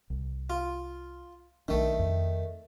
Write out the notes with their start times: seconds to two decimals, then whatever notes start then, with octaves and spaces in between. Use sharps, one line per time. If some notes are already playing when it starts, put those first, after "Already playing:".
0.10 C2
0.50 F4
1.68 B1 D#3 A3 D4
1.99 F2